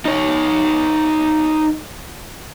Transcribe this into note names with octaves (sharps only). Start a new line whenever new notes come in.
D#4 C#5